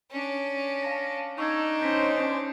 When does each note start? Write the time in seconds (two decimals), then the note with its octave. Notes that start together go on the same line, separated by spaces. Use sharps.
0.11 C#4 D4
0.83 F5 A5 A#6
1.38 D4 D#4 C#6 E6 G#6
1.81 C#4 C5 G6 A#6 B6